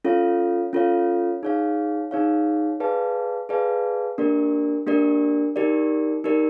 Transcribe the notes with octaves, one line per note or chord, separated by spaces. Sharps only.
C#4 F4 A4 C#5 F5
C#4 F4 A4 C#5 F5
D#4 G#4 C#5 F5
D#4 G#4 C#5 F5
G#4 B4 D5 F5 A5
G#4 B4 D5 F5 A5
A#3 D4 G4 A#4 D5
A#3 D4 G4 A#4 D5
D#4 G4 A#4 D5
D#4 G4 A#4 D5